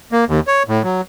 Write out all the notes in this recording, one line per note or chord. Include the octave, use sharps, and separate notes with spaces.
A#3
D#2
C#5
A2
F#3